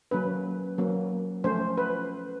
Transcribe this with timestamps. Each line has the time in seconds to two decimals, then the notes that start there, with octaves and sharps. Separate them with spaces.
0.11 F#3 A#3 C#4 B4
0.78 F#3 A#3 C#4
1.44 F3 A3 C#4 C5
1.78 B4